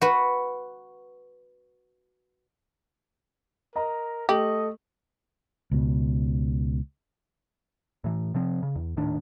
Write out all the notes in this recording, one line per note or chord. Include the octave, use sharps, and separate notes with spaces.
F#4 B4
A#4 D#5 A#5
A3 G4 D#5 F#7
C#2 B2
A2 E3
C3 F3 C4
C#3
E2
D#1 A2 D#3 D4